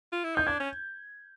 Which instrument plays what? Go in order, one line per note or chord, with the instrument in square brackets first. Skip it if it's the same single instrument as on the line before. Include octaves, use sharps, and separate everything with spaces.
[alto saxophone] F4
E4
[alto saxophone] D#4 [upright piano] G6
[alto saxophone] D4 [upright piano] G#6
[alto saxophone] C#4